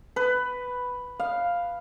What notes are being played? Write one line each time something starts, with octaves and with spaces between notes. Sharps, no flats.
B4
F5